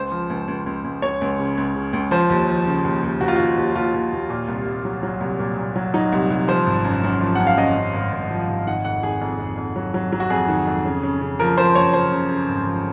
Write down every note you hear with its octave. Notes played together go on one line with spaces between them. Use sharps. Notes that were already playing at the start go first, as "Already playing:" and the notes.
Already playing: C#2 C5
F3
C#2
C#2
C#2
C#2
C#2 C#5
C#2
C#3
C#2
C#3
C#2
F3 C5
D#2
F3
C#3
D#2
D#2
D#2 F#4
F4
D#2 F#4
D#2
D#2 F4
D#2
D#2
A#2
C2
C2
F#3
F#3
C2
A#2
A#2
F#3
F#3 D#4
C2
C2
F3 C5
G#1
F#2
F#2
F3
F#2 F#5
F5
F#2 D#5
F#2
G#1
G#1
F3
G#1
D#3 F#5
F2 F#5
D#3 G#4
F2
F2
F2
F#3
F#3
F#3
F#4
F2 G#4
D#3
F2
C#3
C#3
C#3
F3 A#4
F3 C5
F#2 C#5
C#3 C5
C#3
C#3
G#1
F3